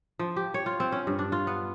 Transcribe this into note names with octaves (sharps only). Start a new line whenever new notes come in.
F3
G4
C#5
F4
C4
C#4
G2
D4
F4
B3